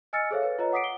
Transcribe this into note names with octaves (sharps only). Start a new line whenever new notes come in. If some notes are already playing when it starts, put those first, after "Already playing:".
D#5 G#5 E6 F6 A6 C#7
G#4 A4 C5 C#5 E5 F5
B4
F4 B4 C#5 D#5 A#5
F#5 D6 D#6 B6 C7 D7
G7